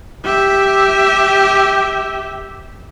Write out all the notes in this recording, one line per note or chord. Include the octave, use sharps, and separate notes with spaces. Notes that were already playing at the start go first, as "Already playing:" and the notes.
G4 E5